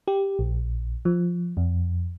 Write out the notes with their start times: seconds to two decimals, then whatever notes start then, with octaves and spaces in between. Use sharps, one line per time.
0.08 G4
0.39 A#1
1.05 F3
1.57 F2